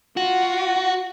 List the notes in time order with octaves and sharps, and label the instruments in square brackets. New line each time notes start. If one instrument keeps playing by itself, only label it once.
[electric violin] F4 [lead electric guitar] F#4